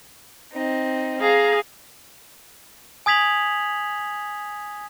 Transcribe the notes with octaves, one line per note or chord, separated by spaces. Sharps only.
C4 D#4
G#4 F5 A#5
G#5 D#6 G#6 B6 F7 F#7